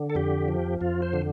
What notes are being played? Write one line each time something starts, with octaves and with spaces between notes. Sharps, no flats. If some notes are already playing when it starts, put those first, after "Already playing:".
Already playing: D3
A4
F2 G4
F3
F2 F4
C5
D3